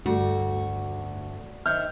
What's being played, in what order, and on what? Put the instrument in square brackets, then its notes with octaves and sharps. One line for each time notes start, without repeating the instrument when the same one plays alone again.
[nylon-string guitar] D2 [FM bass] G2 [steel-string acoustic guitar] F#4
[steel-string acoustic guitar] D#3 C5 E5 [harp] F6 G6